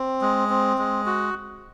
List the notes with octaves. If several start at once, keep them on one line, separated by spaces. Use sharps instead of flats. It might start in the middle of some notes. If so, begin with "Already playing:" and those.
Already playing: C4
G#3
C4
G#3
F#4